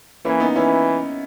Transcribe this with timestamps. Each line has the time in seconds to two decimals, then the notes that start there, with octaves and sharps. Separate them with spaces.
0.25 E3 A#3 C#4
0.40 B3 D#4
0.56 E3 C#4 E4